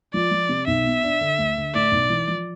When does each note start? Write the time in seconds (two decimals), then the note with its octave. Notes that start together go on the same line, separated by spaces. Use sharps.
0.14 F3 D5
0.31 F3
0.49 C3
0.67 B1 E5
0.85 B2
1.03 D4
1.21 D3
1.38 D2
1.57 D3
1.74 A2 D5
1.92 B1
2.10 E3
2.28 F3